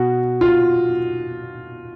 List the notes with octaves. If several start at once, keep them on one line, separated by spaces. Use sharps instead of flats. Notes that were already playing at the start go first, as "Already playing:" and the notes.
Already playing: B2 F#4
F4